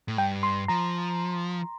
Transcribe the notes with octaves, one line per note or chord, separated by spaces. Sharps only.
A2
G2 G5
C6
F3 A#5